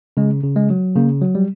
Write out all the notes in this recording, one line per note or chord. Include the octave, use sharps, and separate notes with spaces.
C#3 G#3
C#3
G#3
F#3
C#3 A#3
F#3
G3